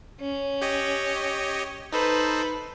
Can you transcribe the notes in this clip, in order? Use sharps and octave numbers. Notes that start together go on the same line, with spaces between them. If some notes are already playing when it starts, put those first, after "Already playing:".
C#4
G4 C#5 D#5
D#4 A4 B4 C5